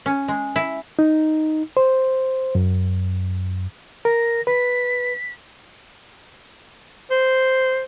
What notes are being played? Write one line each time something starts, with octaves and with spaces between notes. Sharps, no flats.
C#4
G#3
E4
D#4
C5
F#2
A#4 A#6
B4 B6
C5